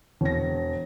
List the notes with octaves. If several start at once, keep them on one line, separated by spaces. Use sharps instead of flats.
E1 A#6